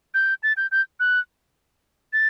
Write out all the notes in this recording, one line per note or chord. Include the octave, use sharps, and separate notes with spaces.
G6
A6
G6
G6
F#6
A6